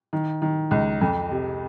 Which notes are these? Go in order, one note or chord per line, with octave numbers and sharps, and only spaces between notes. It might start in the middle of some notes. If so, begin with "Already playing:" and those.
D#3
D#3
C#2
F2
C3